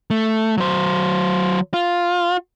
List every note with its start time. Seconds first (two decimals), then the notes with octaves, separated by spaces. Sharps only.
0.10 A3
0.58 F#3 C5
1.74 F4